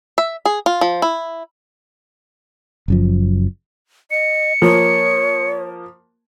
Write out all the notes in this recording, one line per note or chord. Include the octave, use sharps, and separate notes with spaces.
E5
G#4
F4
F3
E4
F#1 F#2 F3
D#5 C#7
F3 A#3 C#5